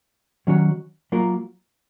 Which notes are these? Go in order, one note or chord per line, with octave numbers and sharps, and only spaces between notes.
D#3 F#3 C#4 F#4 C#5
F#3 A#3 F4 A#4